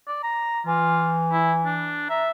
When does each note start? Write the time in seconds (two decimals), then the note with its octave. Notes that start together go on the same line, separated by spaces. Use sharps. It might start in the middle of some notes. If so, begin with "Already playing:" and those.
0.08 D5
0.23 A#5
0.67 E3 F4
1.32 E4
1.65 D4
2.09 E5 A#5